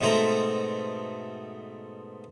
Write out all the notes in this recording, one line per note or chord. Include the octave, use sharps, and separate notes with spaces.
G#2 B2 A3 C4 C5 A#5